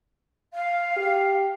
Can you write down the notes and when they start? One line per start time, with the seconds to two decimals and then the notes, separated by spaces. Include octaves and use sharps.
0.53 F5
0.97 G4